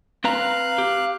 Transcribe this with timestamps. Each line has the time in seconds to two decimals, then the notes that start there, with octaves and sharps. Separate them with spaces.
0.24 C4 B4 F5 A#5 F#6
0.78 G4